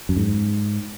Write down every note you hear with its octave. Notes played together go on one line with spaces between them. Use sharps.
F#2
G#2